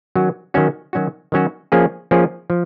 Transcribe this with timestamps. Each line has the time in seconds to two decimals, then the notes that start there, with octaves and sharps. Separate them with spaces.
0.15 D#3 F#3 C#4 F#4
0.54 D#3 F#3 C#4 F#4
0.93 D#3 F#3 C#4 F#4
1.32 D#3 F#3 C#4 F#4
1.72 F3 A#3 C#4 G#4
2.11 F3 A#3 C#4 G#4
2.50 F3